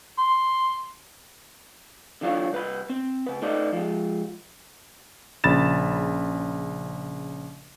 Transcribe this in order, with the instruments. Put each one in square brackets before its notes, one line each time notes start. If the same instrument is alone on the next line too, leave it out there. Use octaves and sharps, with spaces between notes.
[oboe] C6
[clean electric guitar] D3 E3 F#3 D4 F4 C#5
C2 B4 B5
C4
C#3 B4
A3 D#4 B4 D5
F3 G#3
[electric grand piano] A#1 C#3 B5 A6 E7